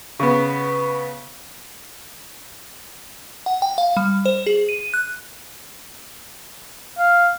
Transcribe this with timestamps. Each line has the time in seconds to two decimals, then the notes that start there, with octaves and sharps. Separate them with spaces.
0.20 C#3 B3
3.46 F#5
3.62 G5
3.78 F5
3.97 G3
4.25 C5
4.47 G#4
4.69 D#7
4.94 F#6
6.99 F5